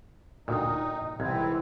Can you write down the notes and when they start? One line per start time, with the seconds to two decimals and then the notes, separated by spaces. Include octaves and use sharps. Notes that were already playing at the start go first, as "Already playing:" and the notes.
0.48 D2 A#2 D#4 G5 D#6
1.20 C2 G#2 E3 C4 E4 G#6